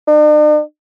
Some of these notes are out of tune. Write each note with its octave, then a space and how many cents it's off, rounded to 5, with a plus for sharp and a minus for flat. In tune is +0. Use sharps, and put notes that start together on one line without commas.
D4 +45